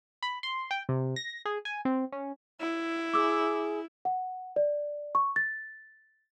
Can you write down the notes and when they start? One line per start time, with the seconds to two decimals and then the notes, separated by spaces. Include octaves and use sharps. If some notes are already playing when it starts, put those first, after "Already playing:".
0.23 B5
0.43 C6
0.71 G5
0.89 C3
1.16 A#6
1.45 G#4
1.65 G#5
1.85 C4
2.12 C#4
2.61 E4
3.13 G#4 D6 E6
4.05 F#5
4.56 D5
5.15 C#6
5.36 A6